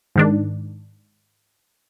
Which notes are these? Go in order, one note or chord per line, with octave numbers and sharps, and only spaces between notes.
G#2 D#3 D4